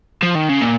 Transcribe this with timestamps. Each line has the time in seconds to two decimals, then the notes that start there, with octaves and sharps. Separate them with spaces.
0.23 F3
0.35 D#3
0.49 C#3
0.61 A#2